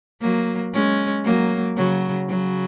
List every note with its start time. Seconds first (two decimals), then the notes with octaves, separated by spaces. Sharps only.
0.21 F#3 A#3
0.74 G#3 C#4
1.25 F#3 A#3
1.77 C#3 F#3
2.29 C#3 F#3